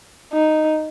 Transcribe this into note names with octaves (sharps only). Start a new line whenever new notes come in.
D#4